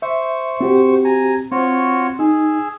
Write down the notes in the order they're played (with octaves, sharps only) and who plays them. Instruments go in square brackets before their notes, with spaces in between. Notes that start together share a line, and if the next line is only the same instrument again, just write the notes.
[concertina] C5 C#6 [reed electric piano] E5
[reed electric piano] C4 F#4 G4
[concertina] G#5 A#5
[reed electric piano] C4 [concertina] F4 F#4 C#5
[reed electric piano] D#4 [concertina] G#4 E6